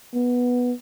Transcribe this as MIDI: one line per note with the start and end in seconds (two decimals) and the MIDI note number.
0.14 0.72 59